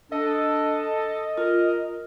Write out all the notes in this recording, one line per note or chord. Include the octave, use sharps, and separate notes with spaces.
D4 A4 D#5
F4 A#4